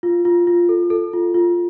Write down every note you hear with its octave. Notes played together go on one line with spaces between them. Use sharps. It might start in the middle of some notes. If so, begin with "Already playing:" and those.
F4
F4
F4
A4
A4
F4
F4